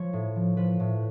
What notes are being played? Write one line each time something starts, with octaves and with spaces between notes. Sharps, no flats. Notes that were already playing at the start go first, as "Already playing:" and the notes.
Already playing: F3 C#5
A2
F3
F3 B4
A2